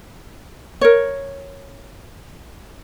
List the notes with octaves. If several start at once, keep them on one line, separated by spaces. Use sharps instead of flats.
A#4 C#5